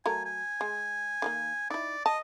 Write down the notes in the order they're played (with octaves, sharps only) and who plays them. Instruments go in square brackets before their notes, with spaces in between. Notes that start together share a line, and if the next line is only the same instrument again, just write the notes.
[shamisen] F#3 A3 A#4 [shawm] G#5
[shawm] G#5
[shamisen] G#3
D#3 G3 A#3
[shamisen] D#4 E4 [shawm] D5
[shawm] D#5 [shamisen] A5